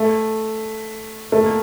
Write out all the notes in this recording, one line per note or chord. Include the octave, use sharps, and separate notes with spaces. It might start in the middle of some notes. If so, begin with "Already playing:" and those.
Already playing: A3
A3
A#3